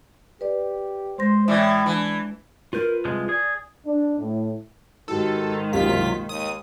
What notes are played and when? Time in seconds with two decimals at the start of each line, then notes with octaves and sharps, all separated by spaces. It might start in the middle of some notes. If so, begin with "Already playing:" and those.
0.41 G4 B4 D5
1.18 G#3 C5 C6 A#6
1.48 A2 E3 D5 E5 D6 G6
1.86 E3 D4
2.73 F4 A#4 B4 G6
3.05 C2 F3 G#3 G#4
3.29 G#4 D5
3.84 D4
4.18 A2
5.08 G#2 D#3 D#4 F#4 G4 A4
5.73 C2 F#2 B2 A#3 F4 G4 B6
6.29 D#2 D#6